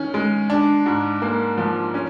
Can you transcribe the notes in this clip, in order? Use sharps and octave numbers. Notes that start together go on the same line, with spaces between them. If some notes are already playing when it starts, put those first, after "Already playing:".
Already playing: D#3 C#4
G#3
D4
G#2
A#3
F3
C#4